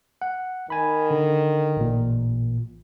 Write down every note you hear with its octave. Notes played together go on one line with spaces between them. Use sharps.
F#5
D#3 G#5 B5
D3
A1 A#2